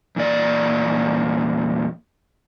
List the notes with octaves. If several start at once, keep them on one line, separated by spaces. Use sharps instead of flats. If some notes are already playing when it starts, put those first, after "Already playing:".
E2 A#2 D5